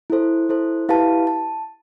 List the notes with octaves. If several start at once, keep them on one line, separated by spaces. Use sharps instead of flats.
E4 A4 C5
E4 A4 C5
E4 G4 B4 F5 A5
A5